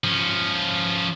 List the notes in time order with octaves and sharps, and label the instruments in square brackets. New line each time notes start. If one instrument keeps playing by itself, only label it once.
[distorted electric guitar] F3 C#4